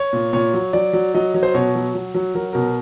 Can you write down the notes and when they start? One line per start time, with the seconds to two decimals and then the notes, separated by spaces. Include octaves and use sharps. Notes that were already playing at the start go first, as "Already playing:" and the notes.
Already playing: C#5
0.13 A#2
0.33 A#2 C#5
0.54 F#3
0.73 F#3 D5
0.93 F#3
1.14 F#3 D#5
1.34 F#3
1.43 C5
1.54 B2 C#5
1.75 F#3
1.95 F#3
2.14 F#3
2.35 F#3 A#4
2.53 B2 A#4